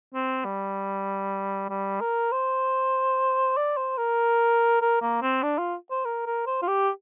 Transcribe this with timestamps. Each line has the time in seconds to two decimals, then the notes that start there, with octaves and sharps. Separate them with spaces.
0.14 C4
0.45 G3
1.70 G3
2.00 A#4
2.32 C5
3.57 D5
3.77 C5
3.98 A#4
4.82 A#4
5.02 A#3
5.22 C4
5.43 D4
5.59 F4
5.90 C5
6.05 A#4
6.26 A#4
6.46 C5
6.62 F4
6.68 G4